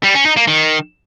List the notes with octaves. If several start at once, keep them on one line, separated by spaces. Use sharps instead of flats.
G3
C#4
D#4
A#3
D#3